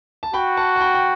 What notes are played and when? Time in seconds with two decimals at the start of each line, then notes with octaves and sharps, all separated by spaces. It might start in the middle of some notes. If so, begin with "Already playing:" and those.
0.23 A5
0.34 F#4 G5 B5
0.57 F#5 A5
0.76 A5
0.81 G5 B5
0.95 G5